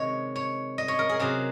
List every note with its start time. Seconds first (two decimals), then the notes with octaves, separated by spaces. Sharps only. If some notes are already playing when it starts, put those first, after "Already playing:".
Already playing: C3 D#3 G#3 C#5 D#5
0.36 C#5
0.78 D#5
0.88 C#5
0.99 A#4
1.09 G#4
1.20 C3 F#3 G#4